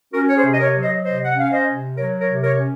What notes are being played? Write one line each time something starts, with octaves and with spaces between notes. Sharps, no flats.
C#4 F#4 A#4
C#5
G#4 C5
C3
D#5
A#4 C#5
F#3
C5 D#5
C3 C5 D#5
F#5
C#4 F5
C5 D#5
C3
F#3 A#4 C#5
A#4 C#5
C3
A#4 C#5
C#4